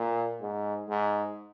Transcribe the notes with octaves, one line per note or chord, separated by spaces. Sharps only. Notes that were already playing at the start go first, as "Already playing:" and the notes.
Already playing: A#2
G#2
G#2